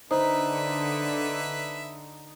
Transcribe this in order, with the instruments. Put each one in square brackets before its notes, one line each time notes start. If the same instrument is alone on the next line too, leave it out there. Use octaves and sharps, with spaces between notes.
[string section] D3 [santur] D#4 [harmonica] B4 E5 [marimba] C5